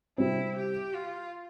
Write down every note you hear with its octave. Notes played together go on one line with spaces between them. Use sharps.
C3 G3 C4 E4
G4
F4